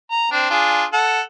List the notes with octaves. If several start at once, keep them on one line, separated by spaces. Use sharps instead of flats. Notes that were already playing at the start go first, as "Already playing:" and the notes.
A#5
C4 D4
D4 F4 G#4
A4 F#5